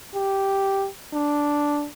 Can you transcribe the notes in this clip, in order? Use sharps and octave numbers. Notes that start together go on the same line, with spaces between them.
G4
D4